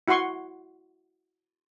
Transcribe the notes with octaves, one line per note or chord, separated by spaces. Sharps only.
E4 F#4 F#5 C6 C#6